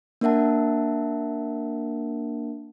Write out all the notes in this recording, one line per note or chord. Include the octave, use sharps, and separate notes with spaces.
A#3 D4 A#4 E5 F#5 A5